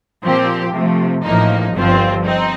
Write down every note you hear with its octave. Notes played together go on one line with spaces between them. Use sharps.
A#2 F3 C4 G4
C3 F3 A3
A1 A2 F3 A#3 D#4
G1 G2 F3 C4 F4
C4 D#4